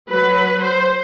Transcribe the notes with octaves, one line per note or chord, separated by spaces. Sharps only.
F#3 B4
C5